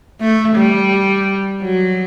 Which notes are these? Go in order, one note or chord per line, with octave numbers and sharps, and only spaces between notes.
A3
G3
F#3